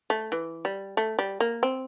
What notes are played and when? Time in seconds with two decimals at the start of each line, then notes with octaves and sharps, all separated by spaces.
0.10 A3
0.32 E3
0.65 G3
0.97 A3
1.19 G3
1.40 A#3
1.63 C4